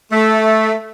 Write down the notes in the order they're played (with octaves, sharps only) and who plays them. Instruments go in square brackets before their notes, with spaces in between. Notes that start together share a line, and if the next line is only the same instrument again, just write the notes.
[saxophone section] A3